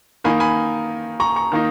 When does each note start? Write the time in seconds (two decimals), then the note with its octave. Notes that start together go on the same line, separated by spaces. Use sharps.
0.24 D#3 A#3 D#4 G#5 B5
0.40 G#5 B5
1.20 A#5 C#6
1.36 A#5 C#6
1.52 D#3 A#3 D#4